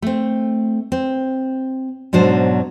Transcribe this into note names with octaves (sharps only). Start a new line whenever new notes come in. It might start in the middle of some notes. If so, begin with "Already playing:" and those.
A3 C4
C4
G#2 B2 F#3 D4 C5